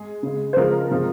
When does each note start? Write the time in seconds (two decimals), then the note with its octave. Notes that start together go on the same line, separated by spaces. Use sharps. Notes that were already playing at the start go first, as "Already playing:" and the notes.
Already playing: G#3 G#4
0.23 C#3 G#3
0.53 C5
0.57 C#3 F3 G#3 A#4
0.91 C3 F3 G#3